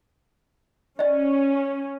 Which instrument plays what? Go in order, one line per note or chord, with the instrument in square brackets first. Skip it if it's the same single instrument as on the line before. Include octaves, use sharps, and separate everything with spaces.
[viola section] C#4 [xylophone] D5 D#5